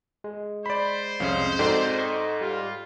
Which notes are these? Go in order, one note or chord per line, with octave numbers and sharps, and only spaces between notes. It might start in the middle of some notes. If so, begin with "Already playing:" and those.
G#3
C5 D5 B5
C2 F2 G#3 C#4 F5 D#6
G#2 C4 D#4 F#4 A4 D5
D#5 C6 C#6
G3 F4